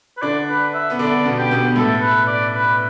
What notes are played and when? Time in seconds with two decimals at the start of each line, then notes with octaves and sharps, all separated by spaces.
0.17 B4
0.22 D3 D4 D5
0.48 B4
0.74 E5
0.90 B3
0.99 D3 D4 D5
1.25 B2 B3
1.38 G4
1.51 B2 B3
1.70 B3
1.76 A2 A3 A4
2.02 B4
2.27 D5
2.53 B4